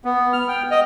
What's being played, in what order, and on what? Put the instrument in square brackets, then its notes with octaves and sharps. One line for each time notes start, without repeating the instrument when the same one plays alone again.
[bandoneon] B3
F6
G5
D#5